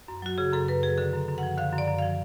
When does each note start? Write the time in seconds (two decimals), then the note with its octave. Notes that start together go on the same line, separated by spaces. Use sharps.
0.08 F#2
0.22 F#3 F#4
0.38 C#3 G#4
0.53 F#2 A4
0.68 F#2 B4
0.83 F#3 G#4
0.98 D3 A4
1.13 F#2
1.28 F#2
1.38 F#5
1.43 F3
1.58 D3 F5
1.73 F#2
1.78 D5
1.88 F#2
1.98 F3 F5